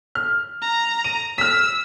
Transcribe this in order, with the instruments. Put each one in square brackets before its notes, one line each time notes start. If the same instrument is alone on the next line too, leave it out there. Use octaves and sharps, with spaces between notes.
[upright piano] F6
[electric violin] A#5
[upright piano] D#7
[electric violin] E6 [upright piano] F6 B6